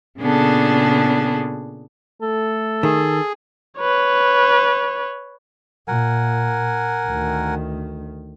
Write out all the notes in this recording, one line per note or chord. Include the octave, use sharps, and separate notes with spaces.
A#2 C#3 B3 D4 G#4 A4
A3 A4
D#3 G#4
B4 C#5
A#2 A#4 F#5 G#5
D2 D#3